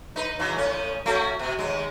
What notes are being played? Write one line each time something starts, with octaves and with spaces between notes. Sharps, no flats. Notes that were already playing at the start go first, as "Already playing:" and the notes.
D#4 B4
C#3 E3 F#3
A2 C#4
A3 C#4 F#4
B2
D#2 G#3